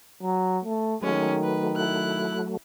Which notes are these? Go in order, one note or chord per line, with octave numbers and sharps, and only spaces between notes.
F#3
A3
D#3 F#3 G#3 A3 C#4
B4
E4 F#6